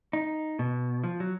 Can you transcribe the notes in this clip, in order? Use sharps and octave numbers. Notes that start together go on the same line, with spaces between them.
D#4
B2
F3
F#3